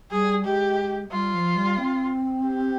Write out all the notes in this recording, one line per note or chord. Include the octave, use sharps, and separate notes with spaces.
G3 G#4
G#3 G4
G3 F4
F3
G3
C4
G4